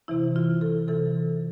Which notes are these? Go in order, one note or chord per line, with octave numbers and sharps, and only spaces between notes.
C3 E3 E4
F4
A4
C3 E3 A4